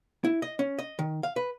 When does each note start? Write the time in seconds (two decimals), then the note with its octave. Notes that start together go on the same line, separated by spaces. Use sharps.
0.24 E4
0.42 D#5
0.59 C#4
0.79 D#5
0.99 D#3
1.23 F5
1.36 B4